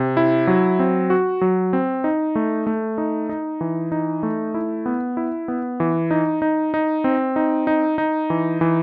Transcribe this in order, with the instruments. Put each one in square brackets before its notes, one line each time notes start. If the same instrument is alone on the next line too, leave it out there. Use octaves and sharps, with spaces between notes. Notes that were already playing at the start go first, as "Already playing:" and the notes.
Already playing: [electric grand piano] C3
E4
F#3
C4
F#4
F#3
C4
D#4
A3
A3
D#4
D#4
E3
D#4
A3
E4
B3
E4
B3
E3
D#4
D#4
D#4
C4
D#4
D#4
D#4
E3
E3